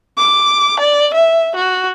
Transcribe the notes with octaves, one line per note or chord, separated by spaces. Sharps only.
D6
D5
E5
F#4